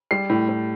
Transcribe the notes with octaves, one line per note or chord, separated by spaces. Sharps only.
G3 C7
A2
A2